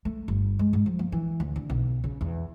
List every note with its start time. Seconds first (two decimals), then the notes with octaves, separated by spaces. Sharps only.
0.05 A3
0.28 G1
0.59 G#3
0.73 G#2
0.86 F3
0.99 A#3
1.12 E3
1.40 D2
1.56 D3
1.70 B1
2.04 C#3
2.21 E2